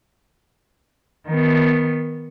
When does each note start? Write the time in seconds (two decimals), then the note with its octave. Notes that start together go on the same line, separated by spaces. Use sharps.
1.28 D#3 B3